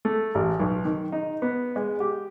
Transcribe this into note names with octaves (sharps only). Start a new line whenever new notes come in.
A3
A1
B1
D#3
D#4
B3
G#3
G4